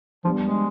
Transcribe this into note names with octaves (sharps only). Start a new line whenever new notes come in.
F3 G3 B3 D4
G#3